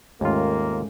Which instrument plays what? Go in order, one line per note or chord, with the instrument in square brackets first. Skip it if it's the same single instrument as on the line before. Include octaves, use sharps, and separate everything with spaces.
[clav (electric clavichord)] D#2 F4 [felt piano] G#2 A3 C#4 [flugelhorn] A#3